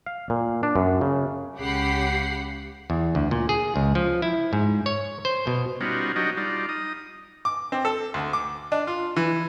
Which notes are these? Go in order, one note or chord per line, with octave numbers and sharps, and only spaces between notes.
F5
A#2
D4
F#2
C#3
C#2 C#3 G4 F#5 B5 C7
E2
D2
A#2
G#4
C#2
F3
E4
G#2
C#5
C5
B2
G3 B3 C#4 D#4 F4 F#4
F#3 D4 D#4 F#4 G4 D#5
G3 D#4 F4 D5
D#4 D#6
D6
C4
A4
D2
D6
D4
F4
E3